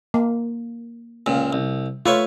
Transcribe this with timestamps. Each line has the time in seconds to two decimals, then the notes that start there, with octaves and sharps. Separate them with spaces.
0.14 A#3
1.26 C#2 A#2
1.53 C2
2.06 A3 F4 B4 C#5